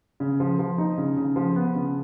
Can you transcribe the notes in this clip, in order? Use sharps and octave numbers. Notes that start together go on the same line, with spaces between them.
C#3
F3
F3
D#4
C#3
C#3
F3
B3
C#3